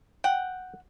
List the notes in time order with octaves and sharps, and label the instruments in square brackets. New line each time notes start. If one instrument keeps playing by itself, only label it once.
[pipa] F#5 [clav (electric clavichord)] G5